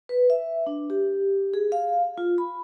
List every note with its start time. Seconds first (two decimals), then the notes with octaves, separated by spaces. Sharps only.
0.09 B4
0.30 E5
0.67 D4
0.90 G4
1.54 G#4
1.72 F5
2.18 F4
2.38 B5